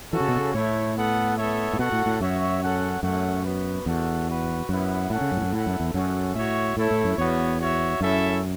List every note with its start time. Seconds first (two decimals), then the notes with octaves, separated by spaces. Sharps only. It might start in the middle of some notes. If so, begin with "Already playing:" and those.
0.12 E3 C#4 F#4 A4
0.20 C#3
0.28 B2
0.36 C#3
0.53 A2 A3 E4 C#5
0.96 B3 A4 F#5
1.38 B3 A4 C#5 E5
1.73 A2
1.79 B2 F#4 A4 F#5
1.92 A2
2.06 A2
2.20 F#2 F#4 C#5 E5
2.61 C#4 A4 F#5
3.03 F#2 A3 C#4 A4 F#5
3.45 B3 F#4 B4
3.86 E2 F#4 A4 F#5
4.27 F#4 B4 F#5
4.69 F#2 B3 E4 B4 F#5
5.10 A2 C#4 A4 F#5
5.21 C#3
5.32 F#2
5.37 A2
5.42 F#2
5.52 A2 E4 A4 F#5
5.66 F#2
5.80 E2
5.93 F#2 C#4 F#4 A4 F#5
6.35 A2 F#4 C#5 E5
6.77 A2 A3 E4 A4 C#5
6.91 A2
7.04 F#2
7.18 E2 B3 F#4 C#5
7.60 F#4 C#5 E5
8.01 F#2 C#4 E4 A4 E5